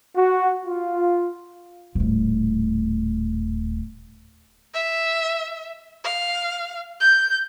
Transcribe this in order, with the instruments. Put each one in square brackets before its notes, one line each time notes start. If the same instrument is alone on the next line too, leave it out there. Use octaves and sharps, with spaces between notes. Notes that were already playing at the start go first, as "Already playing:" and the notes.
[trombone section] F#4
F4
[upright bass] D#1 A2
[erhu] E5
F5
G6